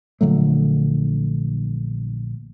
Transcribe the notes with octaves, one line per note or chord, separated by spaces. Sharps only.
A#1 D3 F#3 A3